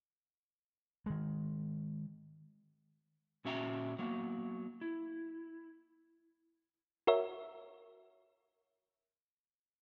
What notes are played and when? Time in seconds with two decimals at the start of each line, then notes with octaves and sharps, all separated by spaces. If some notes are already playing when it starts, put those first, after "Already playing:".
1.06 D#3 G#3
3.45 A#2 C#4 F#4 E5 G5 A#5
3.99 F#3 A#3 B3 F#4
4.81 E4
7.07 F#4 A#4 C#5 E5